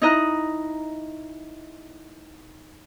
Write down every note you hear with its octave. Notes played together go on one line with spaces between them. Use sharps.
D#4 E4 D#5 A#5 F#6